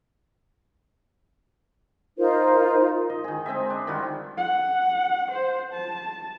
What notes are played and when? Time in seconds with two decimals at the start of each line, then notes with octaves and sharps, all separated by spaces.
2.18 D#4 F4 A#4 C5
3.10 D#5
3.24 D#3 G#4
3.46 G#3 C4 D#5 E5
3.70 D4
3.87 D#3 G3 F4 F#4
4.37 F#5
5.31 C5
5.73 A5